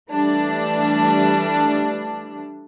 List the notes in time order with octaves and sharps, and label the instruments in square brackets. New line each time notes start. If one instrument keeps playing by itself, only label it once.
[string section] E3 G3 A3 D4